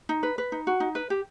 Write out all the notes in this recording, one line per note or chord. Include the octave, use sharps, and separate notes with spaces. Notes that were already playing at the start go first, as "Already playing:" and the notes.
D#4
B4
B4
D#4
F#4
D#4
B4
G4